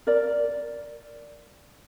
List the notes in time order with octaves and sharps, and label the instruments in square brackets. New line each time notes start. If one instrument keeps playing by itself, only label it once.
[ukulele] A#4 D5